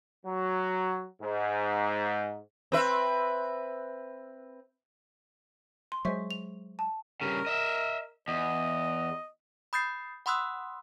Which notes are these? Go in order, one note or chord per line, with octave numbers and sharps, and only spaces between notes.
F#3
G#2
C4 B4 E5
C6
F#3 G#3 C5 E5 C#6
F7
A5
G2 C#3 A#4
D#5 E5
E2 D#5
B5 D#6 G6 A6 C7
F#5 B5 C6 D#6 E6 F#6